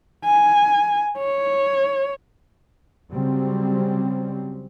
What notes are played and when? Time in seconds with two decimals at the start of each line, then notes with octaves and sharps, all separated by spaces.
0.25 G#5
1.18 C#5
3.11 C#3 F#3 G3 C4